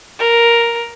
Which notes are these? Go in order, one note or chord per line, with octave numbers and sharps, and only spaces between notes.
A#4